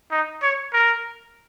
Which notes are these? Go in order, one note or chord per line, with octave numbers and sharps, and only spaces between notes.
D#4
C#5
A#4